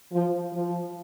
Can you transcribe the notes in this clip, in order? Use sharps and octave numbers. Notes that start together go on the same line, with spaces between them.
F3
F3